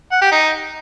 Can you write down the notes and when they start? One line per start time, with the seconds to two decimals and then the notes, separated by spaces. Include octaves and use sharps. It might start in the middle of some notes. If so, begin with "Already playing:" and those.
0.11 F#5
0.21 G4
0.31 D#4